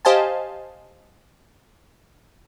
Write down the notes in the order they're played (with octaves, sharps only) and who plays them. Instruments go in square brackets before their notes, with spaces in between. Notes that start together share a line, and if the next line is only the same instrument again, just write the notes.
[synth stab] G4 C5 D#5 F5 G#5 A5